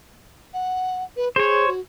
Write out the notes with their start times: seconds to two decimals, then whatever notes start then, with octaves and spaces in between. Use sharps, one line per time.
0.54 F#5
1.17 B4
1.36 G#4 C5 C#5
1.68 F#4